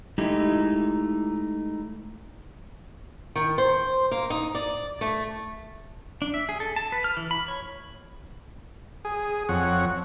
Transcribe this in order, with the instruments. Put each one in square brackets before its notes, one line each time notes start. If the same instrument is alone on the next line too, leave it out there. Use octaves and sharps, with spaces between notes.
[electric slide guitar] G#3 A3 D#4 E4 G4
[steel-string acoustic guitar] D#3
C5
A#3
D#4
D5
A3
[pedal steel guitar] D4
E5
G#4
A4
A5
B4
F6
E3
B5
C#5
[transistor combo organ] G#4
F2 C#5 F#5